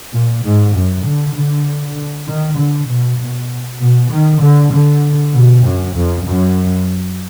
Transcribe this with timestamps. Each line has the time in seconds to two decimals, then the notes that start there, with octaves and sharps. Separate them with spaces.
0.13 A#2
0.44 G#2
0.75 F#2
1.05 D3
1.35 D3
2.28 D#3
2.58 D3
2.88 B2
3.19 B2
3.80 B2
4.11 D#3
4.42 D3
4.73 D3
5.34 B2
5.64 F#2
5.95 F2
6.26 F#2